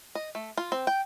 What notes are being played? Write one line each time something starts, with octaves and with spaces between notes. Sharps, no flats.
D#5
A3
F4
C4
G5